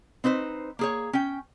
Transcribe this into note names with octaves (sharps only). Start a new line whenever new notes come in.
C4 D#4 B4 C5
A#3 G#4 C#5
C#4 G5